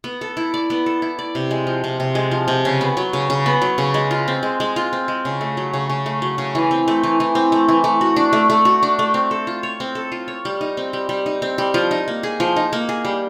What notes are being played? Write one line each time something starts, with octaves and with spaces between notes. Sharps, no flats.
B3
A4
E4
D5
B3
A4
E4
D5
C3
G#3
F3
C3
C3
G#3
F3
C3
C#3
B3
F#3
C#3
C#3
B3
F#3
C#3
G#3
F4
C4
G#3
G#3
F4
C4
G#3
C#3
A3
F#3
C#3
C#3
A3
F#3
C#3
E3
C4
A3
E3
E3
C4
A3
E3
A3
F#4
D4
A3
A3
F#4
D4
A3
C4
A4
F4
C#5
C4
A4
F4
C#5
G3
D#4
C4
G3
G3
D#4
C4
G3
F3
D#4
A#3
G#4
F3
D#4
A#3
G#4
G3